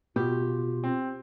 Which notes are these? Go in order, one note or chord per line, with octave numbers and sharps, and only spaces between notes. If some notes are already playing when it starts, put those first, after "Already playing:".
B2 F4 G4
C4